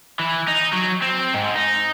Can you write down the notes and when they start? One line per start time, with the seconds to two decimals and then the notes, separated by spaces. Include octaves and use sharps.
0.20 E3
0.48 D#4
0.73 F#3
1.02 C4
1.34 G#2
1.55 D#4